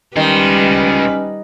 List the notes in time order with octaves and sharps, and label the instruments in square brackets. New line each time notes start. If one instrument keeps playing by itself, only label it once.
[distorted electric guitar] C#2 C6 [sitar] D#3 [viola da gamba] G3 B4 [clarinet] C#4